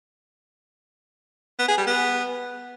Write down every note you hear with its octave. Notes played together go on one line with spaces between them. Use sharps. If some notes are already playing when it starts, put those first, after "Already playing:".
B3
G#4
G3
B3